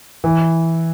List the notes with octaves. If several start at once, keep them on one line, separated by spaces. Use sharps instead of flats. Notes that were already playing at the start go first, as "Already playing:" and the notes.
E3